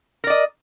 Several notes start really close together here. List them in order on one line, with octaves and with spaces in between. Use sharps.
A#4 D5 D#5